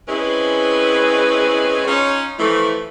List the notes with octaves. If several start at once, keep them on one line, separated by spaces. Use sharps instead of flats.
G#3 C4 C#4 E4 G#4 B4
C#4 D#4 F4 C#5
E3 F3 A3